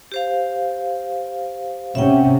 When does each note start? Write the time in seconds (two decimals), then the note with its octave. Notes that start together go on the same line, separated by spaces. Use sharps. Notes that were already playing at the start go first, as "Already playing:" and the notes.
0.12 G4 C5 F5
1.95 C3 C#4 E5 F#5 G5